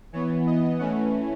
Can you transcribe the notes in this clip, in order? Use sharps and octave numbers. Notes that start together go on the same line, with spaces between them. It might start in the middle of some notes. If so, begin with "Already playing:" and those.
E3 B3 C#5
D#5
E3 A3 C#4 F#5